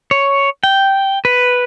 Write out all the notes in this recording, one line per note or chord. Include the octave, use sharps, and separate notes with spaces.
C#5
G5
B4